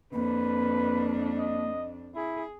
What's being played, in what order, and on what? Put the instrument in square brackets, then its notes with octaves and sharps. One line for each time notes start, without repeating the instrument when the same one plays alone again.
[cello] F2 D4 [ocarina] A#3 [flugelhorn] B4
[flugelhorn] D#5
[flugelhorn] E4 [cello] G#4